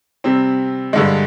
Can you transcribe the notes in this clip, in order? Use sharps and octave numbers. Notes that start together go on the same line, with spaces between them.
C3 G3 C4
G2 D3 G#3